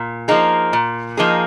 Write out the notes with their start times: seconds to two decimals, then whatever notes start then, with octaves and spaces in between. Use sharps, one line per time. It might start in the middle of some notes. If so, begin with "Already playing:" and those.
Already playing: A#2
0.28 F3 A#3 D#4 G#4
0.73 A#2
1.17 F3 A#3 D#4 G#4